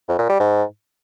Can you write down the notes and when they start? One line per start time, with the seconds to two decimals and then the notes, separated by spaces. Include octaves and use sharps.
0.08 F2
0.19 A#2
0.29 G3
0.40 G#2